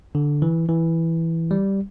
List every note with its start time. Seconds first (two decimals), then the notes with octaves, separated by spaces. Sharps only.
0.15 D3
0.42 E3
0.69 E3
1.51 G3